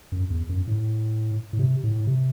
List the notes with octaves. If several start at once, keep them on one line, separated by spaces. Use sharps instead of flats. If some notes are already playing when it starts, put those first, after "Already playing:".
F#2
E2
F#2
A2
A2
C3
A2
C3